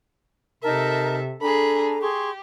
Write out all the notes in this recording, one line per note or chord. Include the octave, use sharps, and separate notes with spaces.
C3 D#4 A4 A#4 E5 A5
D4 G#4 A4 G#5 A#5 B5
G4 G#4 C6 C#6